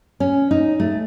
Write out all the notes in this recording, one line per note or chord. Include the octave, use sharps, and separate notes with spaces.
C#4
D#4
A3